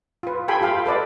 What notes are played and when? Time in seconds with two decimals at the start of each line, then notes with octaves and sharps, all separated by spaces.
0.23 F4 B4
0.48 G4 A4 G5 G#5 B5 C6
0.61 F4 G4 F5 G5 B5
0.86 A4 B4 D5 D#5